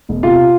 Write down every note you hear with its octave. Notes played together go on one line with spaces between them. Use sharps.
E1
C3 F4 F5